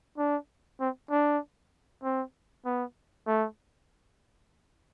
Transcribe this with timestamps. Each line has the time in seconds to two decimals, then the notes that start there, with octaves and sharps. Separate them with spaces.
0.18 D4
0.80 C4
1.10 D4
2.03 C4
2.65 B3
3.27 A3